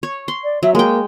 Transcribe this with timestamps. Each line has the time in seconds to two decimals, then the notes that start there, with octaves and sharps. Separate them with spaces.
0.03 C#5
0.28 C6
0.44 D5
0.63 F#3 E5
0.75 G#3 A#3 G5